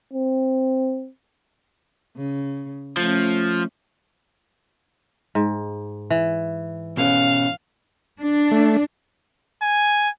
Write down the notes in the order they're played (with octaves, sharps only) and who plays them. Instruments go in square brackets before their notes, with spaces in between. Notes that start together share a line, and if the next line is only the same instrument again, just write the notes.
[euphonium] C4
[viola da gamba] C#3
[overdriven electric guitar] F3 [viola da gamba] A3 C#4
[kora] G#2
E3
[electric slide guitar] B2 B3 C#4 [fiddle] F5
[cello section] D4
[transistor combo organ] A3
[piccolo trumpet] G#5